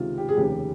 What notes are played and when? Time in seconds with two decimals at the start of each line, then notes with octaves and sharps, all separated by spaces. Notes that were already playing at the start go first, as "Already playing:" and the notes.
Already playing: C#2 C3 D#3 F4
0.18 G4
0.29 G#4
0.37 F1 D#2 C#3 G4